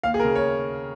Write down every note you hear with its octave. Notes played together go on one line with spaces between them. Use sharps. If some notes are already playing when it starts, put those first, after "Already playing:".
D#2 F5
G#4
A#4
C#3
C#5